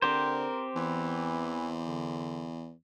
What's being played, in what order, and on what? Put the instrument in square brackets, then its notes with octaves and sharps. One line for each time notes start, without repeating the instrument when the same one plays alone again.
[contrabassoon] D3 [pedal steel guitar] C4 G4 C5 [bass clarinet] A#4
[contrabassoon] E2 [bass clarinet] E3
[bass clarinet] D3